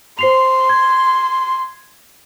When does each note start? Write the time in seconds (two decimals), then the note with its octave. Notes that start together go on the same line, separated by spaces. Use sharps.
0.19 C5 C6 C7 F7
0.69 G#6